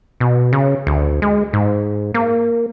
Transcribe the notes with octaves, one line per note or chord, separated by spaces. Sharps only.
B2
C#3
D2
G#3
G#2
A#3